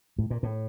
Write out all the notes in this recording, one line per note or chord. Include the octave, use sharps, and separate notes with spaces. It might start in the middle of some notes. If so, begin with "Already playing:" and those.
A2
A#2
A2